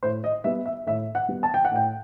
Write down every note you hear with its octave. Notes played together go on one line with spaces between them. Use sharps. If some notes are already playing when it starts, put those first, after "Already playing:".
A2 C5
D#5
G3 B3 E5
E5
A2 E5
F#5
G3 B3
A5
G5
F#5
A2 G5